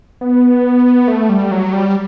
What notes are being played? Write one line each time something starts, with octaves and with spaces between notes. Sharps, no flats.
B3
A3
G3
F#3
G3